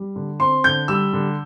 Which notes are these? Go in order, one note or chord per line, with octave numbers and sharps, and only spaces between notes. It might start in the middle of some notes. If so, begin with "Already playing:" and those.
Already playing: G3
D3
C4 C6
D3 G6
G3 E6
D3